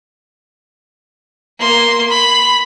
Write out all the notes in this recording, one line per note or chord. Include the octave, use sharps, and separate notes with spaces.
A#3 C6
B5